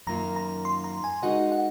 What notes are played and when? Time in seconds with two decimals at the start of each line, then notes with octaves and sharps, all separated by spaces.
0.07 F#2 D#3 A#3 C#4 F4 A#5
0.36 A#5
0.65 C6
0.84 A#5
1.04 G#5
1.22 G#3 D#4 F#4 A#4 D#5 F#5
1.52 F#5